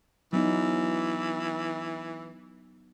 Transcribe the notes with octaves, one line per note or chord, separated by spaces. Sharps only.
E3 F#3 B3 D#4